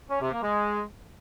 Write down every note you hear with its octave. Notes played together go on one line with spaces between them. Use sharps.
C#4
C3
A#3
G#3